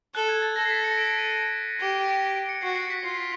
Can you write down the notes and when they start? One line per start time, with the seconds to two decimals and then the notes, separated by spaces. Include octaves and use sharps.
0.15 A4 F#6
0.29 G#6
0.42 A6
0.56 A4 A#6
0.65 C7
0.70 B6
0.84 C#7
0.97 D7
1.18 D#7
1.80 G4
2.22 D7
2.36 D7
2.49 C#7
2.62 F#4 C7
2.76 C7
2.90 B6
3.04 F4 C7